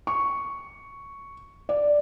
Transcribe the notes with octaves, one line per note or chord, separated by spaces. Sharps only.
C#6
D5